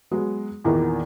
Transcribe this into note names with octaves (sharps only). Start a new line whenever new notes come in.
F#3 G#3 B3
E2 A#2 D#3 E3 A#3 B3